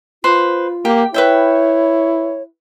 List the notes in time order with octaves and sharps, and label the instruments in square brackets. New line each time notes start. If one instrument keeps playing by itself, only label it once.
[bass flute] F4 [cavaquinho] B4 C5 B5
[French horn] A#3 [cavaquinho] G4
[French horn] E4 [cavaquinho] B4 E5 G5 [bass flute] C#5